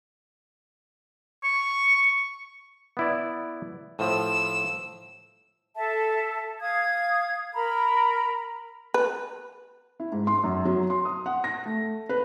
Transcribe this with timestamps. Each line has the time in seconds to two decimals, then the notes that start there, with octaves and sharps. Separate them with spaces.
1.44 C#6
2.97 B3 E4 D5
3.99 A2 F3 E6
5.75 A4 E5 A5
6.61 F5 D#6 G#6
7.54 A#4 A#5 B5
8.94 B4
10.00 E4
10.12 G#2
10.27 C6
10.44 F#2
10.65 F#3
10.90 C6
11.05 D#6
11.26 F#5
11.44 A#6
11.66 A3
12.09 B4